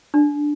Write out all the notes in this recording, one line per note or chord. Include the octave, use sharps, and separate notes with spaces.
D4